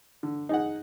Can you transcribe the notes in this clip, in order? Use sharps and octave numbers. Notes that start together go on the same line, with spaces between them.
D3
D#4 G#4 F#5